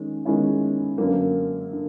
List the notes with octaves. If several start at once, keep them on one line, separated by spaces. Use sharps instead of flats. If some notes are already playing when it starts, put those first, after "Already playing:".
Already playing: D#3 G#3 C#4
D#3 G#3 C#4 E4
F#2 D3 F#3 A#3
D3